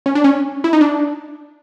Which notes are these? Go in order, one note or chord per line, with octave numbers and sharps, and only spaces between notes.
C#4
D4
C#4
E4
D#4
D4